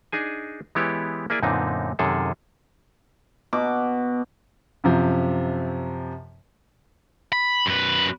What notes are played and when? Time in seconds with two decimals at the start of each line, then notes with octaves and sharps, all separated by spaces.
0.12 D4 D#4 G#4 G#5
0.75 E3 G#3 B3 E4 G4 C#5
1.30 A#3 E4 G#4 D5 G#5
1.42 F#2 A#2 D3 B3 C4 D#4
1.99 F#2 C3 D#3 G#4 A4
3.53 B2 D6
4.84 F#2 C3 F3
7.33 B5
7.66 F#2 B4